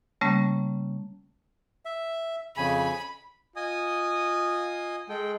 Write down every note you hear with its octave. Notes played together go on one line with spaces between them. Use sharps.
C#3 G3 A3 A#3 C#4
E5
F2 C#3 G#5 B5
F4 D#5 G#5 D#6
G#3 A4 G5